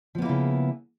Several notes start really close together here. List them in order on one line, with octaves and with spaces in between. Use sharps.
F3 B3 A#3 E4 C#3